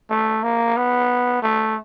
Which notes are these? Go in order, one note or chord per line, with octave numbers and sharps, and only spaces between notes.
A3
A#3
B3
A3